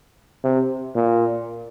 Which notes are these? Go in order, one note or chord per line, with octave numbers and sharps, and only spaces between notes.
C3
A#2